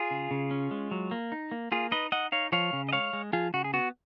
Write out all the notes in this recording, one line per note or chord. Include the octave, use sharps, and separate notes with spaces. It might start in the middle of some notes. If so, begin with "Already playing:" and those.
Already playing: F4 G#4
C#3
C#3
C#4
G#3
F#3
A#3
D#4
A#3
A#3 F4 G#4
D#4 B4 D#5
D#4 D#5 F#5
D#4 C#5 F5
F3 C#5 F5
C#3
D#5
G#3 C#5 F5
G#3
F3 F4 G#4
C#3 F#4
G#4
B3 F#4